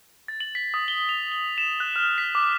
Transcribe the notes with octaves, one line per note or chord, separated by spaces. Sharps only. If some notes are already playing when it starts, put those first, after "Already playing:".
A6
F#7
B6
D#6
G7
F7
G7
E7
F#6
F6
B6
D6